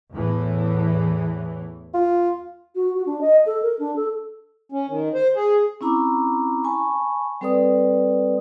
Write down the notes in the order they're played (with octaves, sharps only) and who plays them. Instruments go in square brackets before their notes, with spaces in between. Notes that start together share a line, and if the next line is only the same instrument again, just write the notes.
[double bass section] E2 A2 E3
[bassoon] F4
[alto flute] F#4
F#4
D4
D#5
A4
A#4
D4
A4
[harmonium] C#4
D#3
C5
G#4
[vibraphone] C4 C#4 E4 A#5 B5 D6
G#5 A5 B5 C#6
G3 C4 A4 B4 D5 D#6